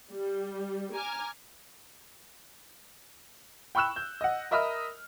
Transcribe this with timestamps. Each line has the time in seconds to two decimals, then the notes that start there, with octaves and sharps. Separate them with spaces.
0.11 G3
0.93 G#5 A#5 D6 F6 G#6
3.75 G5 B5 C#6 E6 F#6 E7
3.96 G6
4.21 D#5 F#5
4.51 A#4 D#5 E5 B5 D#6 F6